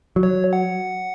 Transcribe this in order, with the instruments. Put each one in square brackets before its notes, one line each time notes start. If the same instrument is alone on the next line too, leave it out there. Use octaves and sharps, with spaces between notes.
[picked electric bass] F#3
[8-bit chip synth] C#5
F#5